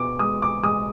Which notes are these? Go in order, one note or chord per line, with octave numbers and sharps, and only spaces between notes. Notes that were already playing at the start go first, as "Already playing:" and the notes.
Already playing: B2 B3 D6
G#3 D#6
D6
G#3 D#6